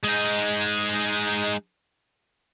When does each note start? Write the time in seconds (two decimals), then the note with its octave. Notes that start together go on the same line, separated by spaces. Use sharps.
0.04 G#3 D#4